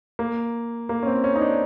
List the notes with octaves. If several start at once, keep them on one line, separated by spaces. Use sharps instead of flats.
A#3
A#3
C#4
C4
C#4
D#4
D4